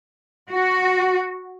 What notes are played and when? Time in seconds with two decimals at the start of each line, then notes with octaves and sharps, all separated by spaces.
0.50 F#4